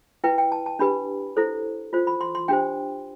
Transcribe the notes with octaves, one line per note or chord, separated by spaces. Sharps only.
E4 B4 G5
G5
A5
A5
D4 G4 B4 B5
E4 A4 C5
F4 C5
B5
C6
C6
D4 G4 C5 G5